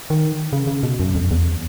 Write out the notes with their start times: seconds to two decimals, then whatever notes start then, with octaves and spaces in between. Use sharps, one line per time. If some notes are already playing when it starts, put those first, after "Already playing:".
0.10 D#3
0.53 C#3
0.67 C#3
0.83 B2
1.00 F#2
1.15 F2
1.31 E2